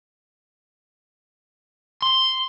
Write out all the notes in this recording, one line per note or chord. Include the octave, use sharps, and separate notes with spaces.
C6